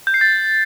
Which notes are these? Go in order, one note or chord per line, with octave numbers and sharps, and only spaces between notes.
G6
C7
A6